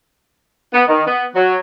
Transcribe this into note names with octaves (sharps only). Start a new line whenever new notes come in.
B3
D#3
B3
F#3